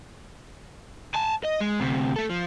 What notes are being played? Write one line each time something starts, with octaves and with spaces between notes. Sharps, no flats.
G#5 A5
D#5
G#3
D2 C3
A3 A4
F3